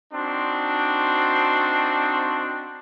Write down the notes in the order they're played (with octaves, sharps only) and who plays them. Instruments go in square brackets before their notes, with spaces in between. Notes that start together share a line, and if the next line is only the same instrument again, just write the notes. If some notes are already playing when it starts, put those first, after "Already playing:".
[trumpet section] C4 D4 D#4 F#4 C6